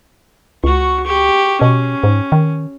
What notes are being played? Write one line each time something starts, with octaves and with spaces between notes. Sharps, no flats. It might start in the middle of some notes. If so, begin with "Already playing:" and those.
C#2 F#4 C#6
G4 C#6
B2 C#4
G#2
D#3